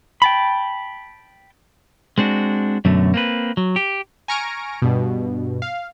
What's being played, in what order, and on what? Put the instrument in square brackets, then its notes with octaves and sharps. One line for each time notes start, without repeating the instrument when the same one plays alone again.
[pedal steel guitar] G5 A5 B5
[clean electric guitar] G#3 C4 D4 F#4
F#2 B2 D3 F#3 A3
A#3 C4 B4
F#3
G4
[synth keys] G#5 A#5 C#6 F6 A#6 D7
G2 B2
F5